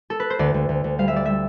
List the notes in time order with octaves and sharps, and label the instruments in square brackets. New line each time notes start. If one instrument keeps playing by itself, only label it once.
[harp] A4
B4
C5
D2 D5
D2
D2
D2
G3 F5
E5
G3 D5
G3 E5